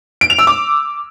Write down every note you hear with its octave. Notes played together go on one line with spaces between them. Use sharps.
D7
F7
E6
D6